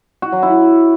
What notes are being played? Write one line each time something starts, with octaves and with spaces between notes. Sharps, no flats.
F#4
F#3
E4